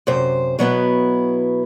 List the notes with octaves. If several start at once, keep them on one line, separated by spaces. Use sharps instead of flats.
F#2 C3 C5
B2 F#3 B3 E4